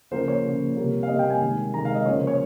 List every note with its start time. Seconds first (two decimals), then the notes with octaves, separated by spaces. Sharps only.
0.11 C#3 F3 A#3 C5
0.28 C#5
0.44 C#3 F3 A#3
0.76 C3 G3 A#3
1.03 F5
1.08 C3 G3 A#3 D#5
1.19 G5
1.30 G#5
1.41 C3 D#3 G#3
1.74 C3 D#3 G#3 A#5
1.85 F5
1.95 D#5
2.06 C#3 F3 A#3 C#5
2.17 C5
2.27 C#5